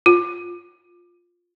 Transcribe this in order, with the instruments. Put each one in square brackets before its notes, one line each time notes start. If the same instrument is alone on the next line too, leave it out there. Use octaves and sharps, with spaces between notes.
[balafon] F4